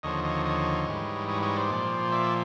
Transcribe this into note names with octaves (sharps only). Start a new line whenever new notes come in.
D#2 D3 F3 C#5 D#5
C#5 D#5
C#5 D#5
G#2 E3 G3
C#5 D#5
C#5 D#5
C5 D5
A#2 F3
D5 E5